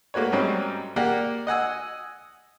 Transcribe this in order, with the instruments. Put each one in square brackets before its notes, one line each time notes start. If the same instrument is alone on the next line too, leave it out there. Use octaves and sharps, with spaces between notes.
[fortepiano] A3 A#3 F#4 B4 C#5
G#2 F#3 G3 C4 C#4
A#3 G4 D5 F#5
D#5 F#5 G#5 E6